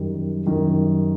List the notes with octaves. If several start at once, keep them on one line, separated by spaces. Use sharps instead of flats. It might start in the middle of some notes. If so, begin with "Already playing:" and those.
Already playing: F#2 D#3 G3
F#2 D#3 G3